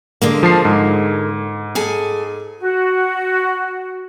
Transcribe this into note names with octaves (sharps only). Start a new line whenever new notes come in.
D3 G#3 A#3
F3 A5 C7
G#2
G#4 A4 G#5
F#4